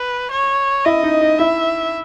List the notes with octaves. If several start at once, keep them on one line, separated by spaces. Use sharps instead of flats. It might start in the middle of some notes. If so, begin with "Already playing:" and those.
Already playing: B4
C#5
E4 D#5
D#4
D#4
E4 E5